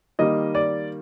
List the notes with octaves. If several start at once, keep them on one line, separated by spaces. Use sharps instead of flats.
D#3 G3 A#3 D#5
D5